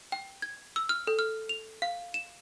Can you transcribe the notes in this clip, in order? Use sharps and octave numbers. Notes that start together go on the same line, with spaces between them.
G5
G#6
E6
F6
A4
F6
F7
F5
E7